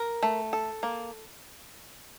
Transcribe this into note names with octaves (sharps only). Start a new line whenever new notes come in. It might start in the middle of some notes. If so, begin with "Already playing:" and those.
Already playing: A#4
A3
A4
A#3